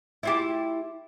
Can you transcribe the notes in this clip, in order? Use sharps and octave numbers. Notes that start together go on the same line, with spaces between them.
E4 F4 G4